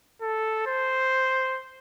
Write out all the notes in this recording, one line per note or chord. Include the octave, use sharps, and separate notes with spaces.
A4
C5